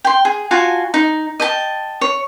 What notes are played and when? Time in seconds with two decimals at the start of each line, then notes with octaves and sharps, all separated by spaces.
0.04 G5 C6
0.25 G#4
0.51 F4 F#4 G#5 A5
0.94 D#4
1.40 D#5 G5 A5
2.01 C#5